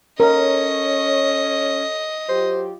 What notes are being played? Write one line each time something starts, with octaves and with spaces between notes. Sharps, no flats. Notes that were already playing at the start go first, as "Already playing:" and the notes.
C#4 A4 A#4 C#5 D#5
F#3 F4 G4 C5